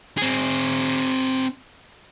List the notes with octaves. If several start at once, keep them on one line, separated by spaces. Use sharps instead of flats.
C4 G#4